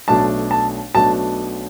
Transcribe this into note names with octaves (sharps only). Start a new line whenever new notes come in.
B1 B2 A3 D4 A5
A5
B1 B2 A3 D4 A5